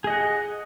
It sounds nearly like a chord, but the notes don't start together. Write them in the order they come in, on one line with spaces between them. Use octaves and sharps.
G#4 D#5 F#5